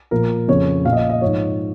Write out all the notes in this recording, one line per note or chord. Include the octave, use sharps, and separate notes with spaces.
A#2 F3 A#4
F2 C#3 F3 C#5
A#2 F3 F5
D#5
F5
D#5
G#2 F3 C#5